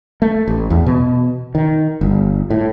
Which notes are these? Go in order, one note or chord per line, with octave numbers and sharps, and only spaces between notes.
A3
A1
E2
B2
D#3
G1
A2